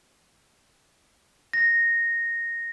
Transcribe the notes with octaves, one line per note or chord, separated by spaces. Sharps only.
A#6